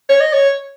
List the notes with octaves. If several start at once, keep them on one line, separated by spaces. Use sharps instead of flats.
C#5
D#5
C#5